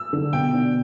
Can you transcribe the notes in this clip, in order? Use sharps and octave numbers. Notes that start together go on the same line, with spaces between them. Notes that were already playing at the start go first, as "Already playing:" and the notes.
Already playing: E6
D3
B2 G5
D4